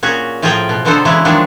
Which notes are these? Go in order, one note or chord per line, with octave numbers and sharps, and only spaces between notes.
A#2 C#4 F#4 G#4
A2 F3 F4 G#4 G5 A#5
B2
B2 D3 F#3 B3 A4 C5
C#3 E3 F#3 G#3 E4
D#3 F3 F#3 G#3 D4